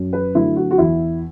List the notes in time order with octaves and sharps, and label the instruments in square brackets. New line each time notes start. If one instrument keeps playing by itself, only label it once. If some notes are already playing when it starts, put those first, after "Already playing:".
Already playing: [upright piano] F#2
B4
D3 F#3 A3 E4
F#4
F#4
E2 E4